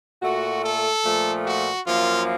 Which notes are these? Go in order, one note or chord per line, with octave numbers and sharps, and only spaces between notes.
A#2 A3 F#4
A4
A#2 F3 A3
F#4
F#2 F3 A#3 F4